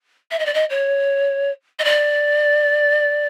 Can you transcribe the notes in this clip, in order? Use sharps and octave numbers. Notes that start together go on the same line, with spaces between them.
E5
D#5
D5
D#5
C#5
D#5
D5